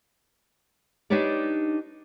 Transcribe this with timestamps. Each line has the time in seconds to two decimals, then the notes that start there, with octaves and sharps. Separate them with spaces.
1.10 D4 D#4 G4 B4 C#5 D5